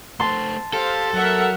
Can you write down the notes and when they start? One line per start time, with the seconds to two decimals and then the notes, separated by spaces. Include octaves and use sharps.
0.20 A3 C4 A5 C6
0.73 G4 A4 C5 F5
1.14 F#3 A#4 E5 F#5